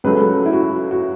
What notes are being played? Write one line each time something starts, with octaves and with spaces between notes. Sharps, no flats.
C#2 C#3 F#3 A3 B4
A4
E4
F#4
F#4